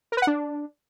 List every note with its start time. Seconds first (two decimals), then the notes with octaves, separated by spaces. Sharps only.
0.12 A#4
0.17 B4
0.22 F#5
0.27 D4